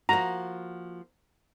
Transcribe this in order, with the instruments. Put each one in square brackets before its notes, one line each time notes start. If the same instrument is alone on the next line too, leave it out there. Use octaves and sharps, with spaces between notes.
[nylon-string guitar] F3 A#3 F#4 [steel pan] A#5